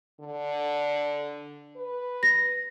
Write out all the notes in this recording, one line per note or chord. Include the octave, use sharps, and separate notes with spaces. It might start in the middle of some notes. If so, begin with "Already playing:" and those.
D3
B4
A#6